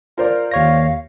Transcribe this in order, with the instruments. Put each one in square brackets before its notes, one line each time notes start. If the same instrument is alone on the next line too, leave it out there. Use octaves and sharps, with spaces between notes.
[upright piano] F4 C5 D5 [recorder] A#4
[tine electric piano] D#2 C#5 A#6 [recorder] F5